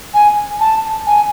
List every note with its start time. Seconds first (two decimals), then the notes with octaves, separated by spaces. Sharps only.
0.14 G#5
0.60 A5
1.07 G#5